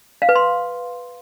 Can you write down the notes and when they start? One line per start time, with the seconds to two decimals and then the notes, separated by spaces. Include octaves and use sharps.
0.22 F5
0.29 B4
0.36 C6